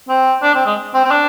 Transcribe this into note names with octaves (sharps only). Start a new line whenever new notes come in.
C4
D4
C4
G#3
C4
C4
D4